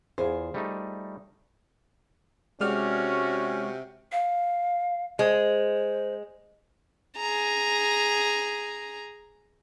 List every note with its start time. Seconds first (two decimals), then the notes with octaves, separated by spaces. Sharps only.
0.18 E2 F4 G#4 C5
0.54 G3 A3 D#4
2.61 C3 G#3 C#4 F#4 D5 F6
4.12 F5
5.19 G#3 C5
7.17 G#4 A#5